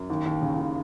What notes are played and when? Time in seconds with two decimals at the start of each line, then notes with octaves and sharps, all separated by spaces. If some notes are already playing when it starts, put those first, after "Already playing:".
Already playing: F#2
0.10 D#2
0.26 D#2
0.42 C#3
0.58 D#2